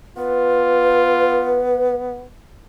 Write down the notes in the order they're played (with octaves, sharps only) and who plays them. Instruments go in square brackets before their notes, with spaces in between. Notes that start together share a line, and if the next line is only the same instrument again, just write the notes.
[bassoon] B3 [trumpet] F4 [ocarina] B4